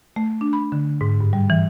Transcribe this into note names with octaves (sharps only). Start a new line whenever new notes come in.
A3
D4
B5
D3
G#2
G2
G3
E3